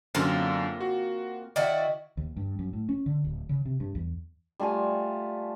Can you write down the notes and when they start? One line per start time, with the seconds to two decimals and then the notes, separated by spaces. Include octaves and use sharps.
0.15 F#2 D3 A#3 C4 F4
0.81 F#4
1.56 D#3 E4 F#4 D5
2.17 D#2
2.36 G2
2.59 F#2
2.73 A2
2.89 C#4
3.06 D3
3.24 D1
3.49 C#3
3.65 C3
3.80 G2
3.95 E2
4.60 G3 A3 F4 G#5